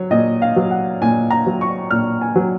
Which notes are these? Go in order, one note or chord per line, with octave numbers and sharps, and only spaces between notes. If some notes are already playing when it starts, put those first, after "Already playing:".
Already playing: F#3 C#5
A#2 D#5
F5
F#3
F#5
A#2 G#5
A#5
F#3
C#6
A#2 F6
G#5
F#3